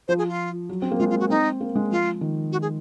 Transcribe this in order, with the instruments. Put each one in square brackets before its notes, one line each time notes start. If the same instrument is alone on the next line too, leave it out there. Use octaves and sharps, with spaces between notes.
[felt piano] F3 [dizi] C5
[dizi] G#4
F4
[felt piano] F#3
C4
A#3
[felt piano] G#3 [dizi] F4
[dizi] F4
F#4
[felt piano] C4 [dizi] D#4
[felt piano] A#3
G#3
[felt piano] F3 [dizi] F4
[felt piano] D#3
[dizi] F#4
G#4